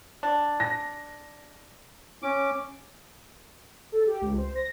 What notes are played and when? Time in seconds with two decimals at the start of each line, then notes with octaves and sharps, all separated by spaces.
0.23 D4
0.60 A#6
2.23 C#4 D6
3.92 A4
4.07 G4
4.21 C#2
4.38 C5
4.56 A#6